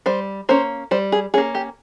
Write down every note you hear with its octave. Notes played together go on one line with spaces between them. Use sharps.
G3 C5
A#3 C#4 C5
G3 C5
G#4
A#3 C#4 G#4
G4